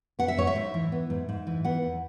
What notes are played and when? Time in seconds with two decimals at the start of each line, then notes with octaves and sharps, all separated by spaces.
0.19 B3 F#5
0.28 E5
0.37 G#2 C#5
0.47 E5
0.56 G#2
0.74 E3
0.92 B3
1.10 G#2
1.29 G#2
1.47 E3
1.65 B3 F#5
1.83 E2